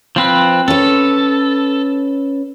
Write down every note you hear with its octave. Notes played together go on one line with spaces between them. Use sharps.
F3 C4 B4
C#4 A4 B4